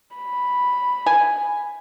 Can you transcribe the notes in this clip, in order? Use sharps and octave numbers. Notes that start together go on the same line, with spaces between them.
B5
G#5